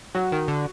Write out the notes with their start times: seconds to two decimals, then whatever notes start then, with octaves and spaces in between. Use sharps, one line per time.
0.15 F#3 F#4
0.32 D#3
0.48 D3